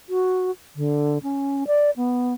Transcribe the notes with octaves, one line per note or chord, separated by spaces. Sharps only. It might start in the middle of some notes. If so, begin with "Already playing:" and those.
F#4
D3
C#4
D5
B3